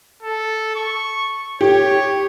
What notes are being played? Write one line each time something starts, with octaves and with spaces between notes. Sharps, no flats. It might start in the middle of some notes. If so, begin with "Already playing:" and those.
A4
C#6
G4 C#5